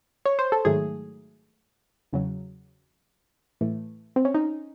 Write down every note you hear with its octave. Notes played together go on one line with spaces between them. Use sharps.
C#5
C5
A4
G#2 D#3 F#3 A3 G#4
E2 C#3 F#3
A2 E3 A3
C4
C#4
D#4